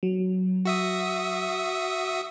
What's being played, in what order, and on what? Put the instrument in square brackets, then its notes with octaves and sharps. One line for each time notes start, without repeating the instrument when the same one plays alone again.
[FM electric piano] F#3
[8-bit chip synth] F#4 E5 D#6